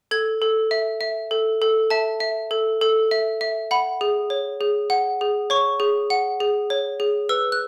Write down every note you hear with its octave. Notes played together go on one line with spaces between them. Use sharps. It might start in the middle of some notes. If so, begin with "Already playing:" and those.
A4 G#6
A4
E5
E5
A4
A4
E5 A5
E5
A4
A4
E5
E5
F#5 B5
G#4
C#5
G#4
F#5
G#4
C#5 C#6
G#4
F#5
G#4
C#5
G#4
B4 E6
F#6